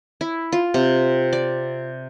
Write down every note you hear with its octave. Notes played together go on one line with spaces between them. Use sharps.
E4
F4
C3
D5